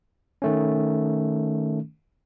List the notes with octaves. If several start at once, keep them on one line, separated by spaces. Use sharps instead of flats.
D#3 A3 C#4